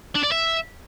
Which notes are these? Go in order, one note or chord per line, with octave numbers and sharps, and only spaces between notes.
D4
D5
E5